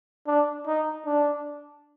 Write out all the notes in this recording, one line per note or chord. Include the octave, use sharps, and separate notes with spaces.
D4
D#4
D4